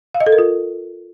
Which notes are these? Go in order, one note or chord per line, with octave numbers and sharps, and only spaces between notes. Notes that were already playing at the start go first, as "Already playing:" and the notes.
F5
D#5
A4
A#4
F4